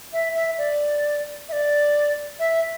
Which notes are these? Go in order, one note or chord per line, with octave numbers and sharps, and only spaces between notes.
E5
E5
D5
E5
D5
E5